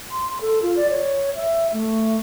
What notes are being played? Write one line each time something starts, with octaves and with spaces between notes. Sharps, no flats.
C6
A4
F4
D5
C#5
E5
A3